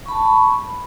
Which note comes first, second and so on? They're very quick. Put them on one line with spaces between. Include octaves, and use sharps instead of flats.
C#6 B5 A5